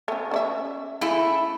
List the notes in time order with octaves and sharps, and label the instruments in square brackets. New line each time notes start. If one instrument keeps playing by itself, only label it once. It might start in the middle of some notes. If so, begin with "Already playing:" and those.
[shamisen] A3 C#4
C#4 D5 E5
[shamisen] C#3 G#4 [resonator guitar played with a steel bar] A3 E4